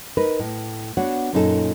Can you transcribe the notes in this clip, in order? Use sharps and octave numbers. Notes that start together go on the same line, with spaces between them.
D#4 A#4 B4
A2
B3 D4 F#4 C#5 F#5
F#2 A#2 C#4 D#4 G#4 A4